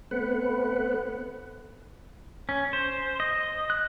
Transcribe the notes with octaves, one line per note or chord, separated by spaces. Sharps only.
A3 B3 C4 B4 F#5
C#4
C5
D#5
F#6